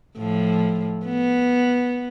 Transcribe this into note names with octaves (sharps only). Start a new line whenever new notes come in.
A2 F3
B3